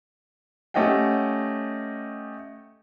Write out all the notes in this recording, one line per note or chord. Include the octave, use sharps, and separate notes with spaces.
A3 C#4 G4 D#5 F#5 G5